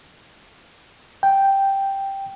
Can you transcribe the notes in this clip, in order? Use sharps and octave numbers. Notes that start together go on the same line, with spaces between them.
G5